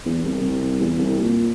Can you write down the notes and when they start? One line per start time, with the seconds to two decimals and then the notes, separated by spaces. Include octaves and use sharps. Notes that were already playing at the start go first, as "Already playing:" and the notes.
0.06 E2
0.24 C2
0.41 C2
0.81 E2
0.98 C2
1.19 A#2